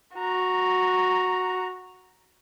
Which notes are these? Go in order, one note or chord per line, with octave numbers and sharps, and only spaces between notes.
F#4 A#5